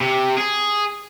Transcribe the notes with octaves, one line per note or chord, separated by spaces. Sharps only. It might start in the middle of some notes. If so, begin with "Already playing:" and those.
C3
G#4